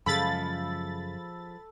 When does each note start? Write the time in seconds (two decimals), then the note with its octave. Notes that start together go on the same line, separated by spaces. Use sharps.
0.06 F#2 C#3 F3 G#3 A4 B5 A6